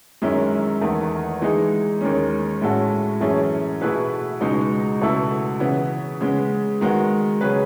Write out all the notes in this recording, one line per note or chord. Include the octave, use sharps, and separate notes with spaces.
F#2 D#3 G#3 C#4 E4
E2 D#3 A3
E3 G#3 D#4 G#4
D#2 D#3 G#3 C#4
A2 G#3 C#4 F#4 A4
F#2 E3 A3 C#4 G#4
B2 A3 E4 G#4 B4
C#2 B2 G#3 D#4
C#2 B2 A3 E4 A4
C#3 E3 B3
C#3 G#3 B3
D#3 G#3 B3 F#4
C#3 F#3 C#4 G#4 B4